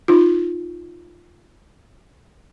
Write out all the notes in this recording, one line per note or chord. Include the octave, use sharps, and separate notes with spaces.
D#4 F4